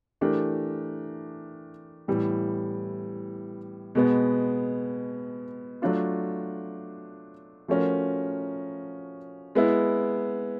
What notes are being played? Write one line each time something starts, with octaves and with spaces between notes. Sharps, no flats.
E3 A3 D4 G4 A#4
A2 E3 G3 B3
B2 G#3 B3
F#3 A3 D4 F4
F3 A3 C#4 F#4 A#4
G#3 B3 E4